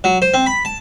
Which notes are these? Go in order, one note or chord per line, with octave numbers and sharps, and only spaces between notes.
F#3
C5
C4
B5
A5